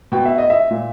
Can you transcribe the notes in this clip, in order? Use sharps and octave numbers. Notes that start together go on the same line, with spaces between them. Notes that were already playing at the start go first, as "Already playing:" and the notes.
B2 G5
E5
D#5
E5
A#2